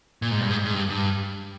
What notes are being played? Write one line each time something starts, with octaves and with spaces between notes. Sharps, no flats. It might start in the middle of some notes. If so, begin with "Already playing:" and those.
A#2
G#2
G2
G#2
G#2
G2
G2